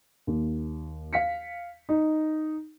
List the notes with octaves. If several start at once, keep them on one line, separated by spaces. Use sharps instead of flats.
D#2
F5 B6 C#7
D#4